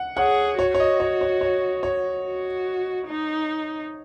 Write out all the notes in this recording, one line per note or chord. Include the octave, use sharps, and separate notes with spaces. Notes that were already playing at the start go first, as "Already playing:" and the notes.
Already playing: F#5
G#4 C#5 F#5
F#4 C#5
C#5
D#5
C#5
C#5
C#5
C#5
F#4
D#4